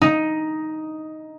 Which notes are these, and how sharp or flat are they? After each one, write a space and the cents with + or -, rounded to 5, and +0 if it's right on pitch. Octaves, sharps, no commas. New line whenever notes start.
D#4 +5